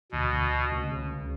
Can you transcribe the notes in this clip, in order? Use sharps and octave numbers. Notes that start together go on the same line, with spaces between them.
D2 B2
D2
D2
C#2
C#3
C#2